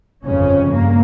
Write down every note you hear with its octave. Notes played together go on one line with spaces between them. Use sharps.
G1 F2 C#3 C#4
G2 A#3